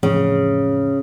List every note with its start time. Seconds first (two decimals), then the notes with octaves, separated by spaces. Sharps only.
0.03 A1 F2 A2 C#3